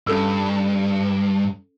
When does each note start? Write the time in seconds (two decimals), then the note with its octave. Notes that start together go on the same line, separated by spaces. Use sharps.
0.07 G2 C#4 A4 E6